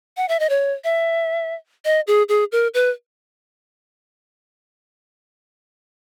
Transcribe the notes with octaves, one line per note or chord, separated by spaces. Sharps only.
F#5
E5
D#5
C#5
E5
D#5
G#4
G#4
A#4
B4